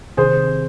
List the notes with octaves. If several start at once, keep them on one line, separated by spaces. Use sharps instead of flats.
C3 D#3 G#4 C5